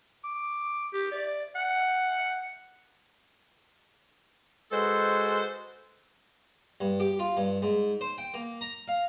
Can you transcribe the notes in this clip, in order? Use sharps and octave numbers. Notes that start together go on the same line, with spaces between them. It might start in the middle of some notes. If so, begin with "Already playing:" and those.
D6
G4
D5
F#5
G#3 F#4 A4 B4 C5
G2
G4
F4
G2
G#2
C5
G5
A#3
A#5
F5